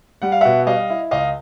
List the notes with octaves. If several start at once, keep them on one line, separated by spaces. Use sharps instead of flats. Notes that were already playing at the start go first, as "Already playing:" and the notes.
G3 F#5
F5
B2 E5 F#5
G3 D#5 F5
E4
C#2 D#5 F5